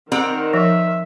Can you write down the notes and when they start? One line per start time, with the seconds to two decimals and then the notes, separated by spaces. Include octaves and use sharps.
0.12 D#3 C4 A#4 D5 F#5
0.53 F3 E5